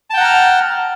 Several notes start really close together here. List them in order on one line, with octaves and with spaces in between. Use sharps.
A5 G5 F#5 A#5 F6